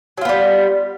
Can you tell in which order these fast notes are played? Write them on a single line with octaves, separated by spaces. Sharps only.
F#3 F4 B3 G3